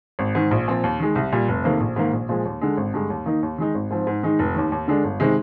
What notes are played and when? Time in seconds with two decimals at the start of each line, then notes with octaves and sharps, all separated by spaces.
0.19 G#1
0.35 G#2 D#3
0.51 A#1
0.68 A#2 F3 C4
0.84 D#2
1.00 D#3 G#3
1.15 C2
1.32 A#2 G3
1.48 F1
1.64 F2 C3 D#3 A#3
1.80 A#1
1.96 G#2 D#3 A#3
2.13 A#1
2.29 A#2 F3 G#3
2.45 D#2
2.61 D3 G#3
2.77 G#1
2.94 G2 D3 G#3
3.10 D#2
3.26 D#3 A#3 D#4
3.43 D#2
3.58 D#3 G#3 D#4
3.75 G#1
3.91 G#2 F3 C4
4.07 G#2
4.23 D#3 G#3 D#4
4.39 F1
4.55 D#2 D#3
4.72 D#2
4.88 D3 G#3 D4
5.04 G1
5.20 C3 D#3 G#3